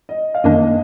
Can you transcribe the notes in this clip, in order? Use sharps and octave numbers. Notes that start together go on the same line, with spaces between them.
D#5
F5
F#2 D#3 A#3 D4 D#5